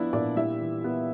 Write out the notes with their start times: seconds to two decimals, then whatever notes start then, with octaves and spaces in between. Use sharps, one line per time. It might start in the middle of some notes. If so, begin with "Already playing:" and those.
Already playing: F3 B3 D4 E4 E5
0.13 A#2 D4 D5
0.36 G3 E4 E5
0.60 E3
0.84 B3